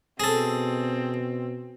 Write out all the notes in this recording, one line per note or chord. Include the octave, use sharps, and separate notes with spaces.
B2 C4 G#4 A4